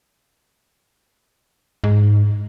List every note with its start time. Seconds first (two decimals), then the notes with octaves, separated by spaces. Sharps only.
1.84 G#2